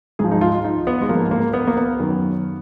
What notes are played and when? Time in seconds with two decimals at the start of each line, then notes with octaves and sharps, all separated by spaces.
0.19 G#2 F3 G#4
0.32 D#4
0.41 F4
0.64 D#4
0.87 B3
1.01 G#3
1.09 G#2 F3 A#3
1.31 A#3
1.53 B3
1.67 A#3
1.77 B3
1.99 F#2 D#3 F#3